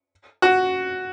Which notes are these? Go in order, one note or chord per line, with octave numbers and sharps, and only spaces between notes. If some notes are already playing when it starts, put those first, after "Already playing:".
F#4